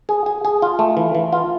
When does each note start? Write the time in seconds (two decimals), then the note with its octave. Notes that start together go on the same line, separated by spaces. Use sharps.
0.09 G#4
0.26 G#4
0.45 G#4
0.62 F4
0.79 A3
0.97 E3
1.15 E3
1.32 F4